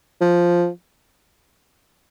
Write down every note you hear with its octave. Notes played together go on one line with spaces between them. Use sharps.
F3